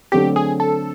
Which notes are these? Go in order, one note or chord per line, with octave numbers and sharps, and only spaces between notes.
D3 F#3 A3 C4 G4
G#4
A4